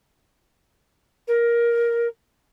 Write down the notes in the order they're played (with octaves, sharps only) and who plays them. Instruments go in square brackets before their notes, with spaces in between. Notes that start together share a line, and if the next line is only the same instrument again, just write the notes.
[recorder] A#4